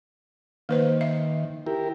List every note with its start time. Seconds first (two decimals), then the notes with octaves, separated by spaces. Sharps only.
0.69 D#3 A#3 B4 C5
1.01 E5
1.67 E4 G4 A#4